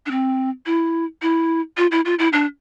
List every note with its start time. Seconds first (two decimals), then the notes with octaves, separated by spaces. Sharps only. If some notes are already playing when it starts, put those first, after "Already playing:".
0.06 D4
0.11 C4
0.66 E4
1.22 E4
1.77 F4
1.91 E4
2.05 F4
2.19 E4
2.33 D4